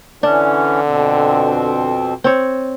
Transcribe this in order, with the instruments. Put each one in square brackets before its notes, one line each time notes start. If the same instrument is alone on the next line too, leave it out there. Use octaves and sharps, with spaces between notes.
[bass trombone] D3 [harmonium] E3 C#4 [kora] D4
[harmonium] F2 B2 C4
[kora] C4 C#5